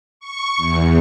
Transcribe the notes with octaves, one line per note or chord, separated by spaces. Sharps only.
C#6
E2